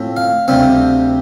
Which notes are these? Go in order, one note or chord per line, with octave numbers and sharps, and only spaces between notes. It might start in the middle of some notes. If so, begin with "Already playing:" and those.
Already playing: A2 F3 C4
F5
D2 C3 G3 C4 F5